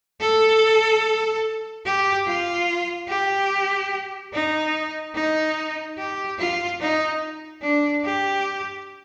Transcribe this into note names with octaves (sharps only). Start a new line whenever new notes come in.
A4
G4
F4
G4
D#4
D#4
G4
F4
D#4
D4
G4